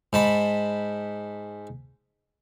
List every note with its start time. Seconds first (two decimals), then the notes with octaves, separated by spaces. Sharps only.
0.13 G#2 A5 B5